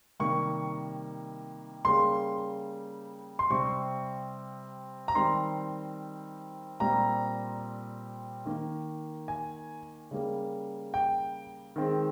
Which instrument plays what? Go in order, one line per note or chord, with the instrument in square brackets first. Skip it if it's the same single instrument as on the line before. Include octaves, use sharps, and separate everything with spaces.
[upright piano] C3 D#3 G3 A#3 C#6
C#3 G3 A#3 C6
C6
C3 G3 C4 C#6
A#5
D#3 G3 C4 C6
A#2 G3 C4 A#5
D#3 A#3
G#5
C#3 G3 A#3
G5
D#3 G#3 C4